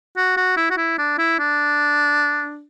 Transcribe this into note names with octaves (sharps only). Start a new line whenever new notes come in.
F#4
F#4
E4
F#4
E4
D4
E4
D4